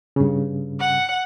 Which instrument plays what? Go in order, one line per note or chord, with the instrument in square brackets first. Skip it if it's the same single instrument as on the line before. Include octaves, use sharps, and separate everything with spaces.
[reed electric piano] G2 C#3
[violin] F#5